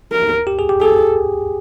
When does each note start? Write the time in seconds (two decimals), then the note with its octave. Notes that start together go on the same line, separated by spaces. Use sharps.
0.12 A#4
0.47 G4
0.59 G#4
0.69 G4
0.81 G#4 A4